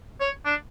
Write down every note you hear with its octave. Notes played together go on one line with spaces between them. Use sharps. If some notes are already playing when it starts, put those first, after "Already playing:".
C#5
D4